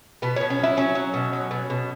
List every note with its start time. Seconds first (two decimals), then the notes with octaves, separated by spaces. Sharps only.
0.22 B2 B3
0.36 B2 C#4
0.50 C#4
0.59 F#3 E4
0.77 F#3 C#4
0.95 F#3
1.14 B2
1.33 F#3
1.51 B2
1.70 B2